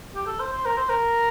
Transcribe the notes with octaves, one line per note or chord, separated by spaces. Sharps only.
G4
A4
C5
C5
A#4
C5
A#4